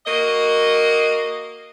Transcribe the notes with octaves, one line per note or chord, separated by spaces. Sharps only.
A#3 F#4 D#5